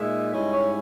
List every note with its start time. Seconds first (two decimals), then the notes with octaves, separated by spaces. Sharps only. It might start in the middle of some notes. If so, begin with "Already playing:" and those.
Already playing: A#2 G#3 D#4 E5
0.32 G#2 G3 C#4 E4 D#5
0.51 C#5